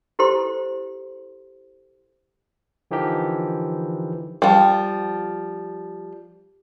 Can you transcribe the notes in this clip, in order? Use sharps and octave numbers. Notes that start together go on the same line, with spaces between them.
E4 G4 A4 C5 C6
D3 E3 F3 D#4 G4 A#4
F3 G3